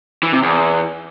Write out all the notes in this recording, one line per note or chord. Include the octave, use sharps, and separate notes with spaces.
E3
C3
E2